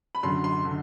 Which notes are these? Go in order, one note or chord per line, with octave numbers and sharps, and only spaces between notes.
B5
F#2 D3 C6
C6
D3